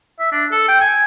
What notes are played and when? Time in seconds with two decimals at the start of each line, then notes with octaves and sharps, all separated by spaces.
0.20 E5
0.32 D4
0.52 A4
0.69 G5
0.81 G#5